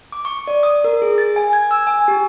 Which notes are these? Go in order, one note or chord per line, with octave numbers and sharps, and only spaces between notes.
D6
C#6
D5
D#6
A#4
G#4
A6
G#5
G#6
E6
G#5
G4